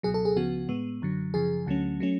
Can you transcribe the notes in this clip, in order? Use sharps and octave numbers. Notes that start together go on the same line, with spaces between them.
C#2 B2 F#3 G#4
A4
G#4
C#2 C#3 F3 B3 F#4
A2 G#3 B3
F#2 D3 F#3
F#2 C#3 F3 G#4
D2 D3 F#3 A3 C#4
F#3 A3 C#4